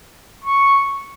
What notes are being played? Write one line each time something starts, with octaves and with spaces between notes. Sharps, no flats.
C#6